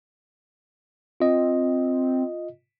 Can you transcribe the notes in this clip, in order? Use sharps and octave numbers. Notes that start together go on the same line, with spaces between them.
C4 F4 D#5